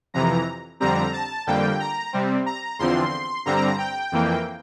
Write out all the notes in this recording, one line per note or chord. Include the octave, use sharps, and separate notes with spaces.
F2 C3 E3 A#5
F2 D3 G3 C4 A#5
A5
F2 D3 G3 A#3 G5
A#5
C3 G3 C4
A#5
E2 D3 F3 C4 C6
G2 D3 G3 C4 A#5
G5
F2 E3 A#3